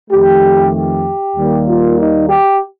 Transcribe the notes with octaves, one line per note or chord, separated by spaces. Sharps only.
F2 D#3 A3 G4
G4
D#2 D#3 G3 A#3
F4
D#4
G4